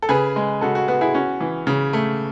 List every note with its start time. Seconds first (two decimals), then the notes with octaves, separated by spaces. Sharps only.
0.02 A4
0.09 C#3 G#4 B4
0.36 G#3
0.61 C#3 F#4 A4
0.75 F#4
0.88 B3 F#4
1.01 E4 G#4
1.14 C#4 F#4
1.41 E3
1.67 C#3
1.93 A3